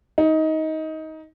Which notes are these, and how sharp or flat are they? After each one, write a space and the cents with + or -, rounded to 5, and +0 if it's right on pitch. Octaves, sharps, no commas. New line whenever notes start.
D#4 +20